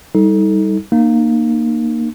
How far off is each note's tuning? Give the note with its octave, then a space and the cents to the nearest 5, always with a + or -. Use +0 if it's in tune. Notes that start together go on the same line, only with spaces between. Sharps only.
G3 +0 D#4 +30 A4 +0
A#3 +0 D#4 -40